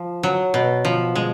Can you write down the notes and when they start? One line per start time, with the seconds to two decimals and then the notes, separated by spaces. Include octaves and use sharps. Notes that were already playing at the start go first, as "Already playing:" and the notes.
Already playing: F3
0.23 F#3
0.54 B2
0.85 F3
1.15 G#3